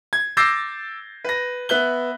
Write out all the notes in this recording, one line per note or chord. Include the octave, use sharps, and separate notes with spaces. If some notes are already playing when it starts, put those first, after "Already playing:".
G#6
D6 E6 G6 A6 A#6 C7
B4 A#6
B3 E5 F#6 G7